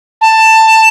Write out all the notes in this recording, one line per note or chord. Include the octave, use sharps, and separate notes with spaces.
A5